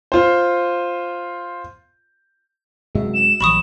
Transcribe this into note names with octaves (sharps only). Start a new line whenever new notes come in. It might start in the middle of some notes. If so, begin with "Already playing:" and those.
F4 C5
F#2 C3 G#3 F#4 E5
E7
A#1 E3 F#3 G3 B5 C#6 D#6